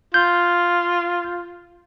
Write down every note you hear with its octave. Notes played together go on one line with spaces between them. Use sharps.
F4 G6